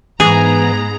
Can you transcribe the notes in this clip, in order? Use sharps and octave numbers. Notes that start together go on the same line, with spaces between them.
G#2 E3 B3 G#4 A#5